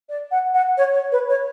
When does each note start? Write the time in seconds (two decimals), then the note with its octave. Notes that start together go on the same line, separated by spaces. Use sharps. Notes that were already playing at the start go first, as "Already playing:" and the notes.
0.09 D5
0.31 F#5
0.54 F#5
0.77 C#5
0.94 C#5
1.12 B4
1.29 C#5